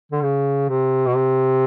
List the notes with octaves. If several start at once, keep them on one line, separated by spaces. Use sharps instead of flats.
D3
C#3
C3
B2
C3